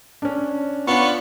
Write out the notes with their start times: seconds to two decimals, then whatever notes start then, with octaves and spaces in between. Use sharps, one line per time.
0.22 C#4 D4
0.87 B3 D4 F4 C#5 C#6